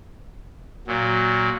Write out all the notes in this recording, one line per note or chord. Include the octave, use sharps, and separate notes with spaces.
A#2 F#3